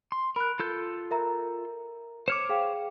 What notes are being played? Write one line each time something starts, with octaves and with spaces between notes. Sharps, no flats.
C6
A#4 B5 F#6
F4 A4 G6
A#4 E5 A#5
C5 C#5 D6 F6 C#7 E7
G#4 F5 G5